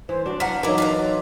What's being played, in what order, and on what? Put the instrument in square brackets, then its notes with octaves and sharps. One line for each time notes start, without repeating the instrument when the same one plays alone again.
[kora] E3 [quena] C5
[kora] D4 [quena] F#4
[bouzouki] F#3 F5 F#5 [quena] A#5 [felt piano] B6
[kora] E3 F#3 [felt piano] D#4 A#4 [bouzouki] E4 A#5 [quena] D6
[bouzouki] F4 B4 A#5